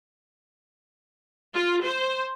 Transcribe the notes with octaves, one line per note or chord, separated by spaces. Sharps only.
F4
C5